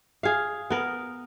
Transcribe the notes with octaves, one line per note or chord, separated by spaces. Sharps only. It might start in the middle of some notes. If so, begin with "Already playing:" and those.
G#4 F5
B3 A#4